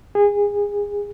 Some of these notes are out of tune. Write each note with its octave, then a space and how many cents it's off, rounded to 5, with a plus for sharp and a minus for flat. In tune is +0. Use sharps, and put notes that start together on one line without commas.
G#4 -25